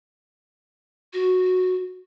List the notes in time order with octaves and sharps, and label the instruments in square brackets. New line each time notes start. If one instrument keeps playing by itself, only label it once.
[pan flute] F#4